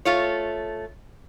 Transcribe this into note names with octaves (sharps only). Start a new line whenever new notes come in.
A3 F4 C#5